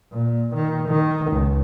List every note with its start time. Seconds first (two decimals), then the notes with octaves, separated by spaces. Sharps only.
0.13 A#2
0.56 D#3
0.88 D#3
1.32 C#2